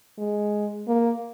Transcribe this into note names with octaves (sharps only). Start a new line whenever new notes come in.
G#3
A#3